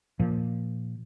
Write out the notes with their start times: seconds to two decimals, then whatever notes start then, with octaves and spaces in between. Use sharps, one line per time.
0.20 A#2 F3